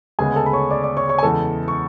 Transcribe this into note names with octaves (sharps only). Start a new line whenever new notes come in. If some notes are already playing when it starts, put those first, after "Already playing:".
D2 C#3 G#3 B3 G#4 G#5
A4 A5
B5
C#5 C#6
D5 D6
D5 D6
C#5 C#6
C#5 C#6
G#5
E2 C#3 G#3 A4 A5
C#6